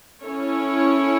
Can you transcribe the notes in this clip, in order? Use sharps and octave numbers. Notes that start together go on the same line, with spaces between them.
C#4 E4 A4 C#5